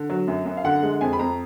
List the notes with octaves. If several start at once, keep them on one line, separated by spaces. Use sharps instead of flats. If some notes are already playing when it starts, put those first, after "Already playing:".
Already playing: D3
F#3
F#2
F#2
F5
D3 F#5
G#3
F2 G#5
B5
F2 A#5